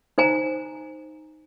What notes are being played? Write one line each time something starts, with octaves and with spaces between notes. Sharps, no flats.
D#4 C5 G#5 A#5